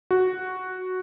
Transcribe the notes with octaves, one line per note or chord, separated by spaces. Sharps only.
F#4